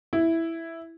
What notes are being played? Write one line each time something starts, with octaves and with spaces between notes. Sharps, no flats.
E4